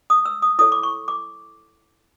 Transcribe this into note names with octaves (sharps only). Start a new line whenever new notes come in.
D#6
E6
D#6
E4 A4 C#5 D#6
D6
C#6
D6